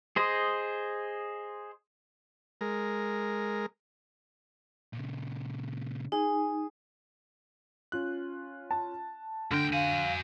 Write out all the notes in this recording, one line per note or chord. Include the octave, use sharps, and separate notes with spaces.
G#4 C5 D#5
G#3 A#4
A#2 C#3
D#4 G#4
C#4 F4 F#6
A5
D2 D3 G5 F6 G6 A#6
F#4 F5 G#5